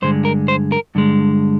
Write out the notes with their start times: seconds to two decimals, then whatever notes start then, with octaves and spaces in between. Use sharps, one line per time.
0.02 G2 D3 G#3 C5
0.25 A#4
0.48 C5
0.72 A#4
0.95 G2 D3 G#3